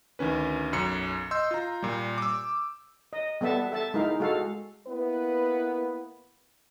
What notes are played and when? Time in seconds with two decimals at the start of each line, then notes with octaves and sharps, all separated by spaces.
0.19 D2 D#3 C#4 B4
0.72 B1 F#2 C#7
1.31 D#5 C6 E6 G6
1.51 F4 A#5
1.82 A#2 G3
2.18 D6 E6
3.13 D#5
3.41 G3 B3 A4 E5 A5
3.72 A4 E5 A5
3.94 G#3 D#4 E4 A#4 F5
4.20 G#3 F#4 A4 F5
4.88 A#3 B3 E4 B4